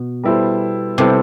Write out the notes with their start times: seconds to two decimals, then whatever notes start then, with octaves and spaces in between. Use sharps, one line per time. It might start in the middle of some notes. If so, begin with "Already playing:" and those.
Already playing: B2
0.24 G3 B3 E4 A4 C5
0.98 C3 G3 B3 E4 A4 C5